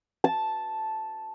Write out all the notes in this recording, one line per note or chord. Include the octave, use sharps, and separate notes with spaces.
A5